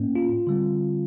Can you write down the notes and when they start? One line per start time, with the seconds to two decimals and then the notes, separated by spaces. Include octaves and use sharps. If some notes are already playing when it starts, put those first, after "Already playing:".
Already playing: A2 A#3 C#4
0.15 F4
0.47 D3 G3 C4